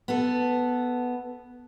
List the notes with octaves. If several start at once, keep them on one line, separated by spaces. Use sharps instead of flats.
B3 A4